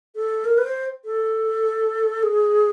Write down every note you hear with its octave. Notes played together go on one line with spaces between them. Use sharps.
A4
A#4
B4
C5
A4
G#4